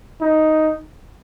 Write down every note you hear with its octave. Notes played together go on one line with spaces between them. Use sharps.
D#4